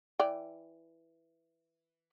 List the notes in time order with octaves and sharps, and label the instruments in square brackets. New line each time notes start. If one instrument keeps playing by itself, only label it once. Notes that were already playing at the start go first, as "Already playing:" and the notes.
[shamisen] E3 D5 G5